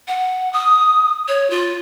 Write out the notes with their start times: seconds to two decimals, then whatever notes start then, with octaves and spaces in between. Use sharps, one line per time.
0.08 F#5
0.53 D#6
1.28 C#5
1.50 F4